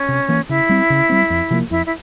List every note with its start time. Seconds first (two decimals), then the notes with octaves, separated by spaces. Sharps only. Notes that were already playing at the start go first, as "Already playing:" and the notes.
Already playing: C#4
0.08 C3
0.28 E3 A#3
0.49 C#3 E4
0.69 G3 C4
0.90 C#3
1.09 G3 C4
1.30 F2
1.50 C3 F3 A#3
1.70 F2 E4
1.86 E4